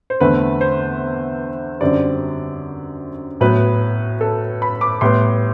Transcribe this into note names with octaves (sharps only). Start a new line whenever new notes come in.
C5
E2 D3 A3 C4 B4
C5
F#2 D3 G3 C4 D5
A2 F#3 B3 B4
A4
B5
D6
A2 G3 B3 C6